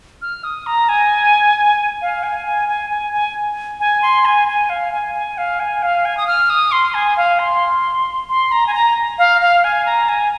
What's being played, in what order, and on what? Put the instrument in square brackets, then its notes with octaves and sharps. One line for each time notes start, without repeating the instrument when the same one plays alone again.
[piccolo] F6
D#6
A#5
G#5
F5
G#5
G#5
G#5
G#5
G#5
G#5
C6
G#5
G#5
F5
G#5
G#5
F5
G#5
F5
G#5
D#6
F6
D#6
C6
G#5
F5
C6
C6
A#5
G#5
A#5
F5
F5
G#5
A#5
G#5